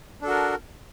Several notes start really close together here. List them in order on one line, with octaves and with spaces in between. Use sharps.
D4 A4 F#4 A#4